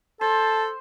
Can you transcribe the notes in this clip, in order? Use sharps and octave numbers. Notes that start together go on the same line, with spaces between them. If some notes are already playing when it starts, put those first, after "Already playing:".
A4 C5 A5